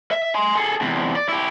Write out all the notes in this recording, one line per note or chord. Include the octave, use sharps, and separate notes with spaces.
E5
G#5 C6
G#4 A4
E2 C3
D5
E4 G4